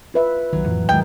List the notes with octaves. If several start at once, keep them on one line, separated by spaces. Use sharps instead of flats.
F4 B4 E5
B1 D#3 F#3
F2 A2 E3
D#1 E2 G#2 D#3 G#3 G5